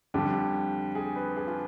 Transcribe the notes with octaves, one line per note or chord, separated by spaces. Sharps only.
F2 D3 G3 G4
G#4
B4
G#4
F4